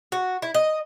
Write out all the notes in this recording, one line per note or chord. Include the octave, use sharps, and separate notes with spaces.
F#4
E4
D#5